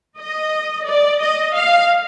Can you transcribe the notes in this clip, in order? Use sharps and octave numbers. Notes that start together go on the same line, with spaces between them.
D#5
D5
D#5
F5